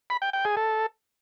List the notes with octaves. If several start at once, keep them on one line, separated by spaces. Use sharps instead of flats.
B5
G5
G5
G#4
A4